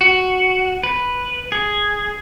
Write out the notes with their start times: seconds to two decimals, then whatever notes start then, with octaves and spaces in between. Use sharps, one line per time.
0.01 F#4
0.83 B4
1.52 G#4